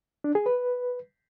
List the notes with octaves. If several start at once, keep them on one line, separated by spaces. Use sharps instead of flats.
D4
G#4
B4